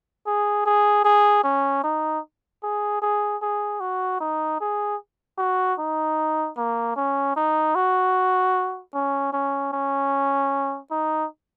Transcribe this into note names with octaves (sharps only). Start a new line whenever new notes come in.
G#4
G#4
G#4
C#4
D#4
G#4
G#4
G#4
F#4
D#4
G#4
F#4
D#4
A#3
C#4
D#4
F#4
C#4
C#4
C#4
D#4